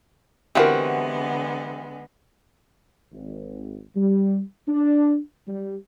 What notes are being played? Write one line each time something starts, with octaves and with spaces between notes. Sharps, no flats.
D3 E3 G#3 B3 C4 F#4 G4 A#4
G#1
G3
D4
G3